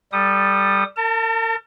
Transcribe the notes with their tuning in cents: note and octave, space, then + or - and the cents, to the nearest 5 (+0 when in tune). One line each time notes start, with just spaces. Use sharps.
G3 +0 A4 +0 D#6 -25
A#4 -40 A5 +30